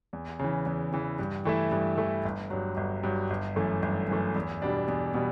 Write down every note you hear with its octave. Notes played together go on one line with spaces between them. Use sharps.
E2
C#3 E3
E2
C#3 E3
G2
E3 A3 E4
G2
E3 A3 E4
G1
G2 F#3
G1
G2 F#3
G1
F#2 E3 A3
G1
F#2 E3 A3
E2
B2 G3 D4
E2
B2 G3